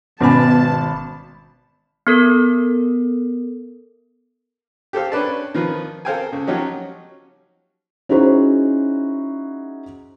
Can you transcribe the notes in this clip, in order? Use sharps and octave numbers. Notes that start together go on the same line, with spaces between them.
G#1 B2 G#3 C#4 G#5 A5 B5 D6
B3 A4 A#4
G4 A4 C5 F5
C#4 D4 B4 D5 A5
D#3 F3 B4
A4 A#4 C5 F5 G5 G#5
C#2
F3 F#3 C#4 D#4 G4
C#4 D#4 E4 F#4 G#4 C5